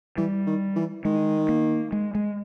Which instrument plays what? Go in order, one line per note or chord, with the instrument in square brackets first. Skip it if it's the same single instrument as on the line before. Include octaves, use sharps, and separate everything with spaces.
[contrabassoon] E3 [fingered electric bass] G3
[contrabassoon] D#3
E3
[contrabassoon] D#3 [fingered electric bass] G#3
[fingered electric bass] A#3
G#3
G#3